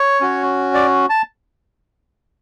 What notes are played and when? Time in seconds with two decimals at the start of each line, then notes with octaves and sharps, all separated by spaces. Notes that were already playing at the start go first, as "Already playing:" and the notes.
Already playing: C#5
0.21 C#4 F#4
0.74 D5
1.10 A5